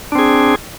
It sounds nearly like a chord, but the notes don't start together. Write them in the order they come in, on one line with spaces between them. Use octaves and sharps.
D4 C4 G#4